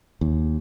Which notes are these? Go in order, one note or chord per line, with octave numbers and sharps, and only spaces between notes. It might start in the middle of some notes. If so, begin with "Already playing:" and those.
D#2